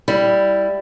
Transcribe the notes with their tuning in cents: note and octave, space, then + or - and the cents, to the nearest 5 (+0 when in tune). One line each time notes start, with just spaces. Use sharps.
G3 +0 E4 +5